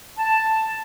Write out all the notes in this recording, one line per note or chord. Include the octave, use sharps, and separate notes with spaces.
A5